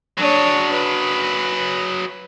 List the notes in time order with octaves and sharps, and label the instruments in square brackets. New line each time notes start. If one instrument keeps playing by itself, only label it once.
[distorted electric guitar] F#3 G#4 [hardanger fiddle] D4 C#5
[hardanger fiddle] B4